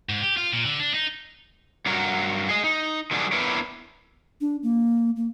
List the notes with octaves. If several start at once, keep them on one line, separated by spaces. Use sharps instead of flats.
G#2
G4
F4
A#2
D3
D4
D#4
G2 F#3 F#4 A#4
G#4 D#5
D#4
D#3 F#3 G3 D4 G#4
B3 D4 E4 A#4 B4 C#5
D4
A#3
A#3